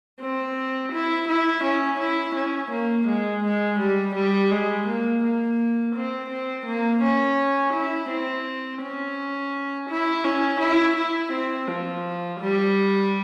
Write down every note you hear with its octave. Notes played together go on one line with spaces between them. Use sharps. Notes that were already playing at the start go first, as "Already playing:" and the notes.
C4
E4
E4
C#4
E4
C#4
A#3
G#3
G#3
G3
G3
G#3
A#3
A#3
C4
C4
A#3
C#4
E4
C4
C#4
E4
C#4
E4
E4
C4
F3
G3